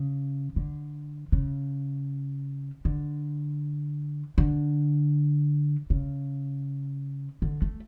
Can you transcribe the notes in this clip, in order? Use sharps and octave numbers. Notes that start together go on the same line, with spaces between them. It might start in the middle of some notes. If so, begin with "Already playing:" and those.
Already playing: C#3
D3
C#3
D3
D3
C#3
D3
A3